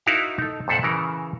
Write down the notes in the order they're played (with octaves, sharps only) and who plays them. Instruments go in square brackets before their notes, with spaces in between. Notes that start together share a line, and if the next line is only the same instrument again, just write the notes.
[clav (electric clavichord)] D#4 E4 F#4 A#4 F5 F#5
D#4 A4
F2 A#2 A4 C5 E5 F#5
C#3 E3 A#4